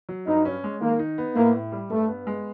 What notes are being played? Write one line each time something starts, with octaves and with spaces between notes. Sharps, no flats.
F#3
G2 D#4
C#4
G#3
D#3 A#3
D#4
B3
A2 A#3
A2
G3
G2 A3
B3
G#3